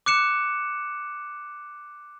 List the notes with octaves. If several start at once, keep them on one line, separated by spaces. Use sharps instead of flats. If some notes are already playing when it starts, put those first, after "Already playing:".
D6 F#6 C#7 E7